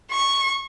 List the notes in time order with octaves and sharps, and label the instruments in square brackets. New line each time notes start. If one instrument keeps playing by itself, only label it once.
[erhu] C#6